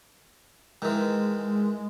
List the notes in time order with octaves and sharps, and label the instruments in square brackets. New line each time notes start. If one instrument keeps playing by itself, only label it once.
[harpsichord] D#3 E3 [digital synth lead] G#3